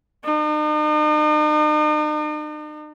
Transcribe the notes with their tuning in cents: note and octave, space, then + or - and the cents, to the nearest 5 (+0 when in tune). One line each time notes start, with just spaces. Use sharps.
D#4 -45